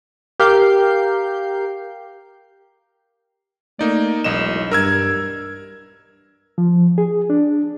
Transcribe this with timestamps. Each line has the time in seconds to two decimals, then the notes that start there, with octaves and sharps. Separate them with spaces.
0.40 G4 A#4 F5 G6 C7
3.79 A3 A#3 D#4 D5
4.24 E1 B1 D#5 E7
4.71 G2 A#4 E6 G#6
6.58 F3
6.98 G#4
7.30 D4